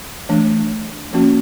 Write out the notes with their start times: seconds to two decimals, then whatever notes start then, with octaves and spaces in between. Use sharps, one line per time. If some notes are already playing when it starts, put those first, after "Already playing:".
0.29 E3 A3 D4
1.13 F3 A#3 C#4 F#4